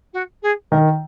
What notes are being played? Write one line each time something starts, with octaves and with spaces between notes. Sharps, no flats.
F#4
G#4
D#3 A#4